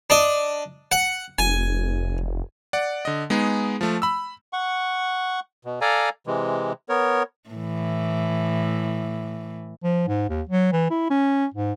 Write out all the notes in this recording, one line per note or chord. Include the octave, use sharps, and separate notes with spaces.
D4 D#5
F#5
F1 G#5
D5 F#5
D3 D#5
G#3 B3 D#4 G#4
F3 A3
B5 E6
F#5 C#6
B2
A4 D5 F5 G#5 A#5
C3 E3 G#3
B3 A#4 C#5
A2 E3
F3
G#2
D#2
F#3
E3
E4
C#4
G#2